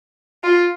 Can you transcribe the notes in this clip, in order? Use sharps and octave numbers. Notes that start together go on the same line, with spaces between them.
F4